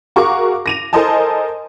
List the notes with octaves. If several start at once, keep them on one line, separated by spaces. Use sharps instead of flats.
F#4 G#4 A#4 F5 C#6 D6
A#6 D#7 F7
A4 A#4 C5 D#5 G#5 A5